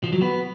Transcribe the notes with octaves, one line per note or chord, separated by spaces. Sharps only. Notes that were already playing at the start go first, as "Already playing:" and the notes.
F3
F#3
B3